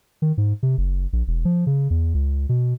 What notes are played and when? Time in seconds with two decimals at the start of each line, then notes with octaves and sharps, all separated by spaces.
0.22 D#3
0.38 G#2
0.63 C3
0.78 F#1
1.13 A#1
1.28 E1
1.45 F3
1.67 C#3
1.90 E2
2.14 C#2
2.49 B2